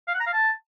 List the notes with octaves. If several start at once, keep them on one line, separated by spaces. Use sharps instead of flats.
F5
F#5
A#5
F5
A5